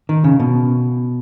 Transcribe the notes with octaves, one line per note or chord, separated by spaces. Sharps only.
D#3
C#3
B2